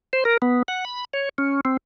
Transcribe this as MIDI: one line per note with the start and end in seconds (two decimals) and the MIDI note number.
0.13 0.24 72
0.25 0.37 70
0.42 0.62 59
0.68 0.85 78
0.85 1.05 83
1.13 1.29 73
1.38 1.61 61
1.65 1.77 60